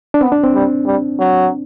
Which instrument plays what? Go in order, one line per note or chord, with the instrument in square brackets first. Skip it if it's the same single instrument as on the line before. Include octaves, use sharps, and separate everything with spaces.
[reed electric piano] D4
[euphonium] B3 [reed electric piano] C4
[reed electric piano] D4
C4
[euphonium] G3
G3
F#3